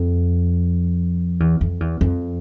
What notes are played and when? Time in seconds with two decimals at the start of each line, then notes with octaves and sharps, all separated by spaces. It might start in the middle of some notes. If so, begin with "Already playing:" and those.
Already playing: F2
1.40 E2
1.61 F2
1.80 E2
2.01 F2